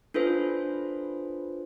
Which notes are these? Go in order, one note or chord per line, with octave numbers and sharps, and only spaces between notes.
D4 F4 A4 B4 C5